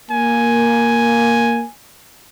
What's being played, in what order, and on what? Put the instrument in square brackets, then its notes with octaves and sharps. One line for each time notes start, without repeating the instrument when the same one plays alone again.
[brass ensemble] A#3 [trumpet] G#5